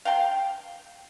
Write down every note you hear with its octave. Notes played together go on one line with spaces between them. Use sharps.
F5 G5 A5 C6